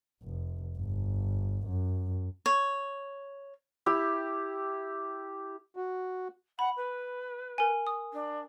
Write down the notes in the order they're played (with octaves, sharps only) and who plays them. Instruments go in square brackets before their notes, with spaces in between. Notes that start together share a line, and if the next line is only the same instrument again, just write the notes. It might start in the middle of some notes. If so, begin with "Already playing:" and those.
[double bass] F1
G1
F#2
[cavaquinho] C#5
[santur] E4 G4
[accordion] F#4
[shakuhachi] F#5 [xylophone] B5
[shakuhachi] B4
[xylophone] A#4 G#5
D#6
[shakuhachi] D4